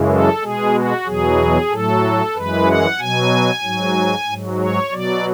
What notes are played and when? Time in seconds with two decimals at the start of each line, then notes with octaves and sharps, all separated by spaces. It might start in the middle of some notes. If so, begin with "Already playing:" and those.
Already playing: F#2 C#3 E3 G#3
0.10 A4
0.42 B2 G#3 G#4
0.74 F#4
1.06 E2 B2 F#3 G#4
1.70 A2 F#3 A4
2.35 F#2 E3 G#3 B4
2.66 F#5
2.99 B2 F#3 G#5
3.64 G#2 F#3
4.27 G#2 F#3
4.60 C#5
4.92 B2 F#3 D5